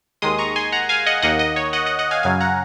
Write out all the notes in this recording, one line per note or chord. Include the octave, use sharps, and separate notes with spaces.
D#2 D#3 G#3 C6 D#6
A#5 C#6
G#5 C6
F#5 A#5
F5 G#5
D#5 F#5
D#2 D#3 A#3 D#5 F#5
D#5
C#5
D#5 F#5
D#5 F#5
D#5 F#5
F5 G#5
F#2 C#3 F#3 F5 G#5
F#5 A#5